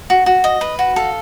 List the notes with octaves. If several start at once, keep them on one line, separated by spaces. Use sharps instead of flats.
F#4
F#4
D#5
B4
F#4
A4 F5